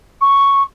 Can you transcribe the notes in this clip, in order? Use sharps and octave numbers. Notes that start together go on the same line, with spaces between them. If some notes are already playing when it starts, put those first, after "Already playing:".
C#6